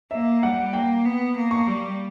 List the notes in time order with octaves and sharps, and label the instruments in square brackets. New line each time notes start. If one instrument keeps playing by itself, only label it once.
[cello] A#3 [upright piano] E5
[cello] G3 [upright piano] F#5
[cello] A#3 [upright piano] G5
[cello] B3
A#3
[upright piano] C#6
[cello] G3